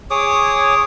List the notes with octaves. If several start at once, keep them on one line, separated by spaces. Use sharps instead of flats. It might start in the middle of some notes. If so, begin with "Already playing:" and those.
G#4 C#5 D6 D#6